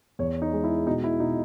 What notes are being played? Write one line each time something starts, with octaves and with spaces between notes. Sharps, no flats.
E2 C#5
D#4
G#3
E4
B2 D#4
E4
B2 D#4